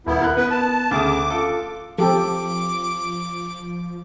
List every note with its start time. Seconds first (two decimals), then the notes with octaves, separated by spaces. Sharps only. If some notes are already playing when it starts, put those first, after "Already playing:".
0.07 D#1 B3 E4
0.22 A#4 F#6
0.37 B3 B4
0.51 A5
0.91 D2 C#3 D6 D#6
1.30 F4 A4
1.98 F3 C4 G4 A4 D6